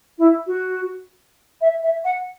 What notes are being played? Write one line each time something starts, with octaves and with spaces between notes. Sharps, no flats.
E4
F#4
E5
E5
F#5